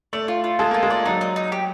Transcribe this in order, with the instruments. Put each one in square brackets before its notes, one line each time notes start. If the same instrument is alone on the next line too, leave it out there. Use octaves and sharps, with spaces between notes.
[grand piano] A3 [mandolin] D5
[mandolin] F4
F4
[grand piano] G#3 [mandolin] A4
[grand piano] A#3 [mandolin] F4
[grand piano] G#3
[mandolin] D5
[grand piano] F#3 [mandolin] D#4
[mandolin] D#4
D#4
G4